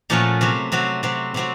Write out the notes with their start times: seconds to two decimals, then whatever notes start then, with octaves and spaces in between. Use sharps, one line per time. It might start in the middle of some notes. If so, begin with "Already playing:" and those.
0.10 A#2 F3 A3 C#4 F#4
0.41 C3 F#3 C4 F#4
0.72 C3 F#3 C4 F#4
1.03 C3 F#3 C4 F#4
1.34 C3 F#3 C4 F#4